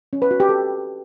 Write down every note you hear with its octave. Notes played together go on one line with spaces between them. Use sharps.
C#4
B4
F#4
G4
A4